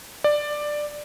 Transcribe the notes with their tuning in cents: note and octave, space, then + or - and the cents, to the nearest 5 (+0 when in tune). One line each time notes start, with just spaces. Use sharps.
D5 +10